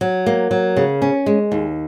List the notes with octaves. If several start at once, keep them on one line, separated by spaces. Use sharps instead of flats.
F#3
A#3
F#3
C#3
C#4
G#3
D#2